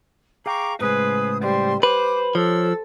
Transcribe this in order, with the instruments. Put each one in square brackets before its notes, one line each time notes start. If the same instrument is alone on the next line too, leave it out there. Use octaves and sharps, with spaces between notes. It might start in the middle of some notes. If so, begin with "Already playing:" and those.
[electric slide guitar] G#4 F5 G5 [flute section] A#5 C#6 D6
[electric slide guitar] A2 C#3 G#3 [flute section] G#4 C5 D#6 [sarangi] B4
[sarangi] G3 [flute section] C5 C6
[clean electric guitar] B4 [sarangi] C5 [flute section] D6
[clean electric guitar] F3 [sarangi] A4 [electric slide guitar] C#5 [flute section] E6